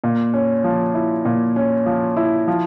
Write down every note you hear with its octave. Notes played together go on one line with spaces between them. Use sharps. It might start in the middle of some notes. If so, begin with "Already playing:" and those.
A#2
C#4
F3
E4
A#2
C#4
F3
E4
F3